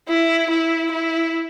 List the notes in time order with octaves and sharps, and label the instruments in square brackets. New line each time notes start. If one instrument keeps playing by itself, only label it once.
[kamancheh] E4
E4
E4